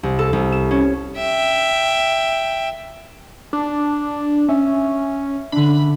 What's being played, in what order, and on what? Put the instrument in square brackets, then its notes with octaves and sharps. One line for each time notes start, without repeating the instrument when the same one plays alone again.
[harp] C2
A4
C2
E7
C#4
[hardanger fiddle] E5 G5
[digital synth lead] D4
[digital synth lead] C#4 [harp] E5
[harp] D3 D4 [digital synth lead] B5